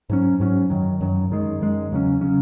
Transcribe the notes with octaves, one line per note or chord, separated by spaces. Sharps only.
G#2 F#3 C#4
G#2 F#3 C#4
F#2 D#3 F#3
F#2 D#3 F#3
F#2 D#3 G#3
F#2 D#3 G#3
E2 C#3 F#3 C#4
C#3 F#3 C#4